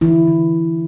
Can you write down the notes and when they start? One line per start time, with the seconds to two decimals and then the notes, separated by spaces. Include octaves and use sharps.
0.01 D3 E3 E4
0.27 D3